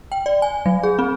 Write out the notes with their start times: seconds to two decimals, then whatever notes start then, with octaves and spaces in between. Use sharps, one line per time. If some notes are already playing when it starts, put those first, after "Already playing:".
0.12 G5
0.26 D5
0.42 G#5
0.66 F#3
0.83 G#4
0.99 C4